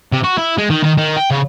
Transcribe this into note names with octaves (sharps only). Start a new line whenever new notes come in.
C3
F#4
E4
G#3
D#3
D#3
D#3
G5
C#3